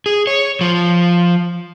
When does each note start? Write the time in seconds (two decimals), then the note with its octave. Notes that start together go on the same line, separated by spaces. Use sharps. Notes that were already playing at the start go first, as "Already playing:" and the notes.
0.06 G#4
0.27 C#5
0.61 F3